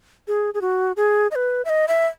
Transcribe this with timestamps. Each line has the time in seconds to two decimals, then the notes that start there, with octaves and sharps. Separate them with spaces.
0.28 G#4
0.54 G#4
0.61 F#4
0.97 G#4
1.31 D#5
1.35 B4
1.65 E5
1.69 D#5
1.88 E5